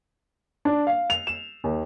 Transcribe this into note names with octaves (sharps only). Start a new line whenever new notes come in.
D4
F5
F7
E7
D#2